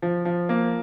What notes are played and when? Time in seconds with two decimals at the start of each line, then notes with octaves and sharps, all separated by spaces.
0.02 F3
0.25 F3
0.49 A#3